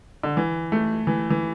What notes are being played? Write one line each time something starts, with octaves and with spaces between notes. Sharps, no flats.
D3
E3
A3
E3
E3